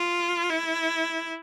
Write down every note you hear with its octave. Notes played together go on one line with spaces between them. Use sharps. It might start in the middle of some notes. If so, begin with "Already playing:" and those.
Already playing: F4
E4